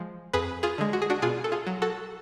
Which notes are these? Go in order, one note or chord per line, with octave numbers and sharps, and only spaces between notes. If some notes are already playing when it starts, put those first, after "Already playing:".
Already playing: F3 G#3
F2 G#4 B4
F4 G#4
D3 G#3
F#4
G#4
D4 F#4
B2 F4 G#4
A4
F4 G#4
F#3
F#4 A4